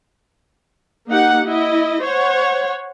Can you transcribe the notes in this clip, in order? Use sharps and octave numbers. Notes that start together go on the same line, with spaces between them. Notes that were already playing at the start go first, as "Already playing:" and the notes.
A#3 D#4 G4 F#5
E4 D#5
C5 C#5 F#5